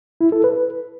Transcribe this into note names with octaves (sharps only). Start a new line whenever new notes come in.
E4
A4
B4